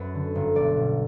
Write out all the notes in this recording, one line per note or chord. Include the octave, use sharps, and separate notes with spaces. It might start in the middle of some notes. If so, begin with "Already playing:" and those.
Already playing: F#2 B4
D3
G1
B1 D5
B2